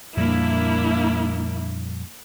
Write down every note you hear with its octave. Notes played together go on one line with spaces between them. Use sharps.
F2 A#2 G3 A#3 D4 E4